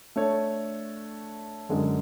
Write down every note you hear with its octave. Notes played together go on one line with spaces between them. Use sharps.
A3 D4 A4 C#5
F#2 D3 G#3